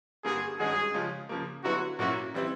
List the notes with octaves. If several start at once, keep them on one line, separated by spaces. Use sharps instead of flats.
G2 D3 G3 A#3 G#4
G2 D#3 G#3 C#4 F#4 G#4
C#3 F3 G#3 C#4 F4
C#3 F3 A#3
D3 F#3 B3 E4 F#4
A#2 F#3 A#3 C#4 E4 F#4
E3 G3 C4 E4